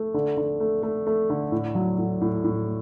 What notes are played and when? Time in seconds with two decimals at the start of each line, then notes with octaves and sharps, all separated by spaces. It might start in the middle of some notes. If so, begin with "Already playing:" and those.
Already playing: A3
0.14 D3
0.37 D3
0.60 A3
0.83 A3
1.07 A3
1.30 D3
1.52 A2
1.75 F#3
1.98 A2
2.21 A2
2.44 A2
2.66 A3